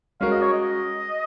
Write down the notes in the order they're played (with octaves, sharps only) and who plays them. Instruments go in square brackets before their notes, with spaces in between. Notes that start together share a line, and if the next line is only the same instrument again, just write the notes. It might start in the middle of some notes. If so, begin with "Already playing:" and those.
[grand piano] G#3 C#4 F#4 A#4 [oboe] F5
[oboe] D#5
C#5
D#5